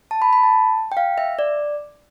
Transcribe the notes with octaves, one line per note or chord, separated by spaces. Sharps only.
A5
B5
B5
A5
G5
F5
E5
D5